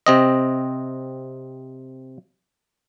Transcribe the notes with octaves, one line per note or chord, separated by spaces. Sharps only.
C3 C4 D#5